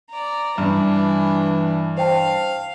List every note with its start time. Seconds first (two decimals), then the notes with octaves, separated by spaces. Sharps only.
0.10 D5 A#5
0.58 G2 E3 D4 E4
1.98 C5 F5 G5 A5